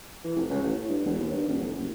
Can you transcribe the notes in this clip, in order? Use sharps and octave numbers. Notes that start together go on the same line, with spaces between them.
E3
F1
C#2
A1
A2
G2
E1
D#2
G2
D#1
F1
F#1